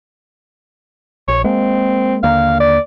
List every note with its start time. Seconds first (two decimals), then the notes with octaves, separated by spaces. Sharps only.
1.28 A#1 C#5
1.44 G#3 A#3 C4
2.23 D#2 D3 A#3 F5
2.60 D5